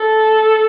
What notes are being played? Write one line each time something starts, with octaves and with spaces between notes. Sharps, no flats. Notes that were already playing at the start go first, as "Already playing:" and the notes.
Already playing: A4